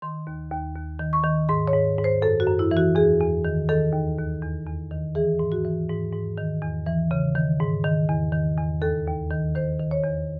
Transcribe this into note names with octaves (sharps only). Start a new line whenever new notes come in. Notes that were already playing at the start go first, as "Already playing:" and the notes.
D#3 C6
D#2
D#2
D#2
D#3
C#6
D#3
G#2 C6
C#5
G#2
G#2
C5
F#2 A4
F#4
F#2
E4
E3
F#4
E2 G#4
E2
D#3
D#3 A4
D#2
D#2
E2
E2
D#3
E3 G#4
G#2
F#4
E3
G#2
G#2
D#3
E2
E3
C#3
D#3
G#2
D#3
E2
D#3
E2
D#2 A4
D#2
D#3
D#3 C5
D#3
C#5
E2